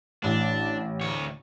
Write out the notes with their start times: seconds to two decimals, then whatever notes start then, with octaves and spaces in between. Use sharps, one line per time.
0.24 A1 D4
1.01 D2 C#5